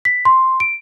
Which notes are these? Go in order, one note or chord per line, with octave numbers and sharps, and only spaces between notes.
B6
C6
D7